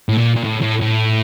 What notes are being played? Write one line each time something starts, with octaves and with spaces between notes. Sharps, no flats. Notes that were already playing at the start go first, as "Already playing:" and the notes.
A2
A#2
A#2
A2
A2
A2